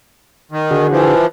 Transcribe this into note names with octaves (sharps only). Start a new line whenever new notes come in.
D#3
D3 F#4 G#4
E3 F3